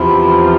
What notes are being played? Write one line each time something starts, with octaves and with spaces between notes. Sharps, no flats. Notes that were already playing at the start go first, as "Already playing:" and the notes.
Already playing: E2 C3 F3 E4